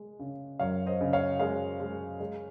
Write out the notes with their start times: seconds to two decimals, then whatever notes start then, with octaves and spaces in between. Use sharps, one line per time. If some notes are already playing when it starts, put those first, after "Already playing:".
Already playing: G#3
0.19 C#3
0.59 F#2 C#5 F5
0.86 C5 D#5
1.01 C#3
1.13 C#5 F5
1.39 G#3 C#5 F5
1.80 G#3
2.20 G#3